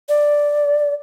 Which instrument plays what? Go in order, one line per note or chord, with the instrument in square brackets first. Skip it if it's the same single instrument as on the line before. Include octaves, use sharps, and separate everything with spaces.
[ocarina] D5